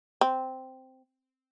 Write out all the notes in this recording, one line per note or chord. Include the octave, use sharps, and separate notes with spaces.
C4